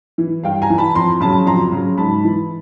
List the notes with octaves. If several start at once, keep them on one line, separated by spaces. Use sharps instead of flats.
E3
G2 F5 G5
G#5 A#5
E3
A5 B5
F2 A#5 C6
C#3 F#3 A5 B5
F2 A#5 C6
C#3 F#3
G#2 A5 B5
E3